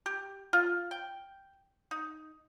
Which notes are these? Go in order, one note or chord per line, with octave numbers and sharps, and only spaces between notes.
G4
F4
G5
D#4